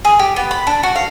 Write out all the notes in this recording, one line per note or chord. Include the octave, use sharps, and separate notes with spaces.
G#4
G4
B3
B5
D4
F#4
F5